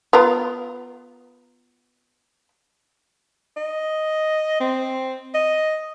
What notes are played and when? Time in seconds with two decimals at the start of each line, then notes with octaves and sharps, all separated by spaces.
0.13 B3 F4 A#4
3.57 D#5
4.60 C4
5.34 D#5